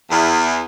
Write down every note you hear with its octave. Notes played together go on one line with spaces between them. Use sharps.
E2